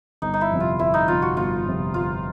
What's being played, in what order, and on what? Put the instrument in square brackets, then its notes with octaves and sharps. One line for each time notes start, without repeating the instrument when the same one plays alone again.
[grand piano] G1 [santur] D#4
[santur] D#4
E4
[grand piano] F2 C3
[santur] F4
[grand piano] G1 [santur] E4
[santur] D#4
[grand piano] F2 C3 [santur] F4
[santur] F#4
[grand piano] G1 [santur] F4
[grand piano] F2 C3
[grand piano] G1 [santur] F4